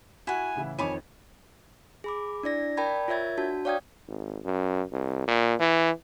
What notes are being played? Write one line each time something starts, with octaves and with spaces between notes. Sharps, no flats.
E4 F#4 F#5 G#5
A2 C#3 E3
F2 D#3 C#5 G#5 B5 D6
G#4 B5 D6
D4 E4 D5 A#6
A#4 D5 G5 A5 B5 G#6
F4 A#4 C#5 E5 G#6 A6
D4 F#4 A5
C#5 D5 F5 G5 D#6 G#6
G#1
F#2
C2
A#2
E3